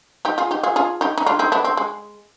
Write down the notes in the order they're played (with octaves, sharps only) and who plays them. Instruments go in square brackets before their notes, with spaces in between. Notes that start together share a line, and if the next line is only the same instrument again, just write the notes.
[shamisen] D#4 G4
F4 G#4
D#4 G4
F4 G#4
F4 G#4
D#4 G4
D#4
D4 F4
C4 D#4
B3 D4
C4
G#3